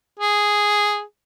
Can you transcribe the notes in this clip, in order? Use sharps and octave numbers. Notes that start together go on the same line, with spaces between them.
G#4